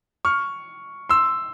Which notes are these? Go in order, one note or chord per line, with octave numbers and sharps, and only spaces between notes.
C#6 F6
C6 E6